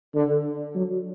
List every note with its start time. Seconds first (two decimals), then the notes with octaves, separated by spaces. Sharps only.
0.15 D3
0.75 F#3